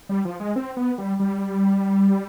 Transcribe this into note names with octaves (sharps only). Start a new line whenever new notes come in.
G3
F3
G#3
C4
B3
G3
G3